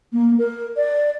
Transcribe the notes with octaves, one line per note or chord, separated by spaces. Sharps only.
A#3
A#4
D5